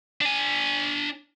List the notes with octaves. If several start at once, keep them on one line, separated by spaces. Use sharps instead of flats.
D4 G#5